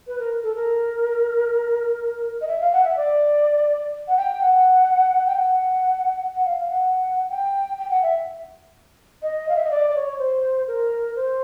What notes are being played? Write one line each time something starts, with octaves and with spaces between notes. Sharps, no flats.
B4
A#4
A4
A#4
D#5
E5
F5
F#5
E5
D5
F#5
G5
F#5
G5
F#5
F#5
F5
F5
F#5
G5
G5
F#5
E5
D#5
F5
E5
D#5
D5
D5
C#5
C#5
C5
A#4
C5